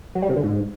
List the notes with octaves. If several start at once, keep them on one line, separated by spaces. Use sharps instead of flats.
F#3
G3
C3
D3
G#2